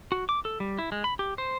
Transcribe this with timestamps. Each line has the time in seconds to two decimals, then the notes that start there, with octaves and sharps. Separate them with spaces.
0.12 F#4
0.29 D6
0.45 A4
0.60 G3
0.79 E4
0.92 G#3
1.04 B5
1.19 G4
1.38 C5